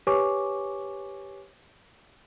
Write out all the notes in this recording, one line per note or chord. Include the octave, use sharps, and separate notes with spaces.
G4 B4 C#5 G#5 C#6 D6